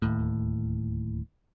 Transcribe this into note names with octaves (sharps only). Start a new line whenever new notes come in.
D1 D#2 A2